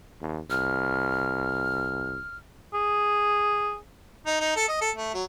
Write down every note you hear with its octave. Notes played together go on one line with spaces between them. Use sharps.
D#2
C2 F6
G#4
D#4
D#4
A4
D#5
A4
A3
F#3